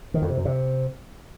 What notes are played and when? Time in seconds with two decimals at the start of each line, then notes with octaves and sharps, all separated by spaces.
0.14 D#3
0.22 F2
0.30 C3
0.37 F#2
0.45 C3